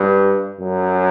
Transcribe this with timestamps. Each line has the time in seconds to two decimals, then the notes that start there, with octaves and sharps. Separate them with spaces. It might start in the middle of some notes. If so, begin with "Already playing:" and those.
Already playing: G2
0.61 F#2